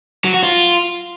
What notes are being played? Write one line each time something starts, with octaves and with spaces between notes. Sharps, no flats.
F#3
F#4
F4